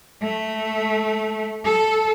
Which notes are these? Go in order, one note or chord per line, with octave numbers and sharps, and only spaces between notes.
A3
A4